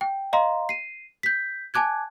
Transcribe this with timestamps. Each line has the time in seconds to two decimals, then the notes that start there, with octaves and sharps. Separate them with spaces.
0.01 G5
0.33 D#5 F5 A#5 C6
0.69 C7 D#7
1.23 G6 B6
1.74 G#5 A5 D6 F#6 G#6